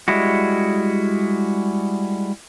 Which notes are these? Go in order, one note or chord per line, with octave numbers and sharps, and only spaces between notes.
G3 G#3 E4 F#4